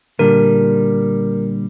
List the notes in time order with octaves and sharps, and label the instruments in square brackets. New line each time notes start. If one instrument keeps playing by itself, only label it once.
[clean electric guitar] A#2 D3 G3 [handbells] A#4